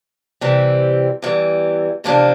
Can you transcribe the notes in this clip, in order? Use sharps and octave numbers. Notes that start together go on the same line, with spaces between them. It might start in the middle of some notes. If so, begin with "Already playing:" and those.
C3 E3 G3 C4
E2 E3 G3
E2 C3 F3 A#3 D4